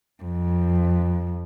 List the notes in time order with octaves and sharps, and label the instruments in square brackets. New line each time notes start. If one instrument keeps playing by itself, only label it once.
[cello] F2